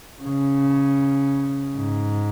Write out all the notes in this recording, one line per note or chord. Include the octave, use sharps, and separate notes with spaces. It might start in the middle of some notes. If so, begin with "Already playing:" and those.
C#3
G#2